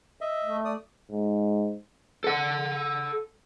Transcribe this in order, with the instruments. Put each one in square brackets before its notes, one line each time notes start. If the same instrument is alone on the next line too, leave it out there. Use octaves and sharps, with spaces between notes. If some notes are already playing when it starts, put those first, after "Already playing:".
[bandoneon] D#5 E5
[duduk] A3
[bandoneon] D5 D#6
[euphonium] G#2
[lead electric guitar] A4 F#5